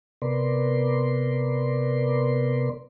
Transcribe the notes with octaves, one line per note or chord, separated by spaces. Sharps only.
C3 B3 A#4 B4 D5 C6